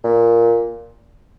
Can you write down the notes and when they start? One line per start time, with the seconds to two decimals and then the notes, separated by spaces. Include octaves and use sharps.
0.04 A#2